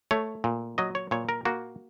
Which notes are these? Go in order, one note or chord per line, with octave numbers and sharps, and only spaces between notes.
A3 C#5
A#2
F#3 D#5
C#5
A#2 C#5
A#4
A#3 F#4